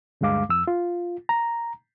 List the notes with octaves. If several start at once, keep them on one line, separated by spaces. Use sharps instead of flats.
D2 G2 G#3 F5 D6
F2 E6
F4
A#5